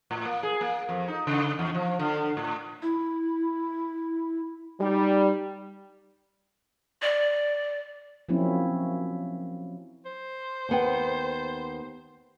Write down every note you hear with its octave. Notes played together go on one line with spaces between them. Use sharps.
A2
A#3
G#4
A#3
F2
D#4
C#3
E2
F3
D3
A2
E4
G3 D#4
D5
F3 F#3 A#3 C4 C#4 E4
C5
D#2 B3 G5